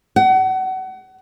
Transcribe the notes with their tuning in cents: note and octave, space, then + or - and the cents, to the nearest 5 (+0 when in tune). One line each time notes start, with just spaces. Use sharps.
F#5 +30